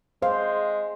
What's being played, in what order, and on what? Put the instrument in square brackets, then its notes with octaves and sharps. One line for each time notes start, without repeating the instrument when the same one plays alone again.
[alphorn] G#3 [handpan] C5 [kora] F5